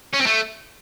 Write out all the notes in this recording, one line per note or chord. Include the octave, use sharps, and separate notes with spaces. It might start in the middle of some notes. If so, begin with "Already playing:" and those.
C#4
C4
A3